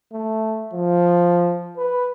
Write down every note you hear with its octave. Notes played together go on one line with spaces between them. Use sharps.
A3
F3
B4